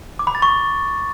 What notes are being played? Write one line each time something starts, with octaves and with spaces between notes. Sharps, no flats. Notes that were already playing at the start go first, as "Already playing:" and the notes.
D6
B5
A6
C#6